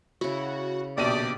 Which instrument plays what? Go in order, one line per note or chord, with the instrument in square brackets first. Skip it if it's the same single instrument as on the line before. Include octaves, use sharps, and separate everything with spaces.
[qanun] C#3 E4 [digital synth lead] F#4
[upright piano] A#1 B2 D#7 [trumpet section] G4 D5 [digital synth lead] D#6